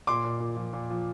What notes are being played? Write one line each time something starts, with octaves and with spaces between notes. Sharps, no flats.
A#2 C6 D6
A#2
A#2
F3
A#2
F3